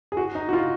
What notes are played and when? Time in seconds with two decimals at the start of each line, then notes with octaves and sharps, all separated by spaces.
0.12 G#4
0.17 F#4
0.35 D#4
0.49 F#4
0.53 F4